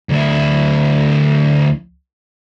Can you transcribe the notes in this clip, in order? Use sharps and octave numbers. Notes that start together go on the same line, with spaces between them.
D2 E4